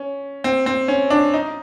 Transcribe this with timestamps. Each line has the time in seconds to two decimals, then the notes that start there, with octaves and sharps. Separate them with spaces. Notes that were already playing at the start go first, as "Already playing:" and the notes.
Already playing: C#4
0.44 C4
0.66 C4
0.88 C#4
1.10 D4
1.34 D#4